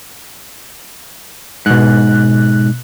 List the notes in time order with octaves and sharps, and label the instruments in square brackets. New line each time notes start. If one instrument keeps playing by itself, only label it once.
[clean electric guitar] G#2 [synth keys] B2 F#6